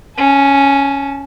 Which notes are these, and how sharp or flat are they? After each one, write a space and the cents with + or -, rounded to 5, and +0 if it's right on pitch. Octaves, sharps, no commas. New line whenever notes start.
C#4 +0 A5 -30